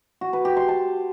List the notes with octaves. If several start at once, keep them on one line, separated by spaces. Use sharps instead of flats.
F#4
B4
G4
C6
A5